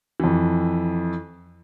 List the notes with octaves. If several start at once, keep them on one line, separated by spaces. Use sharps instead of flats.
F2 E3